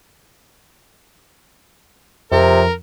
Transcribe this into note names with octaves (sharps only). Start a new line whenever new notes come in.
F2 C3 A#4